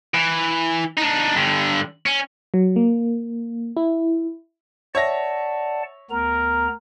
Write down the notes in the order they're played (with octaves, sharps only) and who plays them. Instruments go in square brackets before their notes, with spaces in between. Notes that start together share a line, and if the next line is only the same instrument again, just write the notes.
[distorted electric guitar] E3
D4 D#4
G2 D3
C#4
[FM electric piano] F#3
A#3
E4
[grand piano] C#5 E5 A#6 [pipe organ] D5 F#5 A5
[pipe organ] D2 B3 A#5 [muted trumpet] A#4